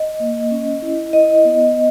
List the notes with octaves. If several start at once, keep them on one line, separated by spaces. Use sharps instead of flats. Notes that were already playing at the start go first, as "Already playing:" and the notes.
Already playing: D#5
A#3
C#4
E4
E4 D#5
B3
D#5